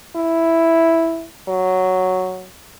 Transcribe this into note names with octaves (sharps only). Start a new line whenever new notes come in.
E4
F#3